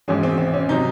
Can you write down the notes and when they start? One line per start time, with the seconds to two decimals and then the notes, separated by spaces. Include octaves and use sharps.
0.08 G#1 G#2 E3 G#3 C#4
0.23 C4
0.38 C4
0.54 C#4
0.69 C3 F#3 D#4